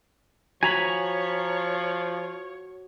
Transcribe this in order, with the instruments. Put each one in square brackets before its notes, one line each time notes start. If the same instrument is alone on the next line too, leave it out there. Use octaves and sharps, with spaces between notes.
[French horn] F3 [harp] F#4 [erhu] C#5 [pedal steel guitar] G#5 A#5 B5